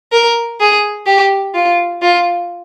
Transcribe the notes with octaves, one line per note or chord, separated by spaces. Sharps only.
A#4
G#4
G4
F4
F4